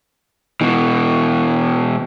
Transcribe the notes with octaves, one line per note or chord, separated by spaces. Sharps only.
B2 E3